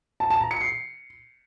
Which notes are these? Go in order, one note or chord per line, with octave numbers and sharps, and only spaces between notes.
A5
A5
A#5
C#7
C7